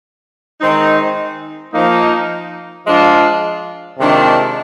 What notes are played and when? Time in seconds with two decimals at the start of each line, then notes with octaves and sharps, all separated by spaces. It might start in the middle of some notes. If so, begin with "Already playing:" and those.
0.61 D#3 G#3 C4 D#4
1.74 F3 A#3 D#4
2.86 F3 G#3 D4 F4
3.98 C3 D#3 G#3 D4 F4